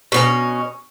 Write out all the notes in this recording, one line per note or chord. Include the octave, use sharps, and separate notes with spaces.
B2 B3 C#4